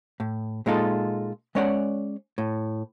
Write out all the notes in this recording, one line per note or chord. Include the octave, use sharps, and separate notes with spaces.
A2
A#2 G#3 D#4 F4 A4
G#3 C#4 C#5 D5 F#5
A2